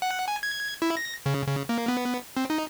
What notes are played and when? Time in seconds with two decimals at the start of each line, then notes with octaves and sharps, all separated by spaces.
0.02 F#5
0.28 G#5
0.43 G#6
0.82 E4
0.97 A#6
1.26 C#3
1.48 C#3
1.69 A#3
1.88 B3
2.37 C4
2.50 D#4